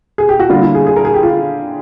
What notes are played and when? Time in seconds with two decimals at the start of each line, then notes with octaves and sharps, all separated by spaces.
0.18 G#4
0.29 G4
0.40 F#4
0.49 D3 G3 A#3 F4
0.62 E4
0.75 G#4
0.87 G#4
0.96 A#4
1.05 G#4
1.14 G4
1.23 F4